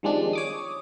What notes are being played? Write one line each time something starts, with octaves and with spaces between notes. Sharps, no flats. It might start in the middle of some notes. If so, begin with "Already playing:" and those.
D#3 F3 G3 G#3 C4 D4
C#5 D6 D#6